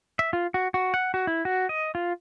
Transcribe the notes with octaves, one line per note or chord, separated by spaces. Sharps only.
E5
F4
F#4
F#4
F#5
F#4
E4
F#4
D#5
F4